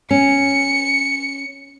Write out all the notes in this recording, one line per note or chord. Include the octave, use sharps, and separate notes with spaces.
C#4 C#7